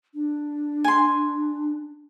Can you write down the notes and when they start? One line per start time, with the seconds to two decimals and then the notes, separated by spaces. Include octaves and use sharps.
0.14 D4
0.84 G#5 C6